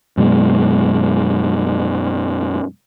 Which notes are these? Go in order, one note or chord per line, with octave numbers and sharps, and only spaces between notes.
F#2 B2 G#3